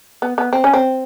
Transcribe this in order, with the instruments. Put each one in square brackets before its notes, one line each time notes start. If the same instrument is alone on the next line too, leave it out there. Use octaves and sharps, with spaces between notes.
[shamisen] B3
B3
C4
C#4
C4